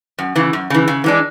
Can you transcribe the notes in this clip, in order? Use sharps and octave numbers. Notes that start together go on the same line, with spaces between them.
F#2
C#3 E3
F#2
C#3 E3
C#3
E3 G#3 D4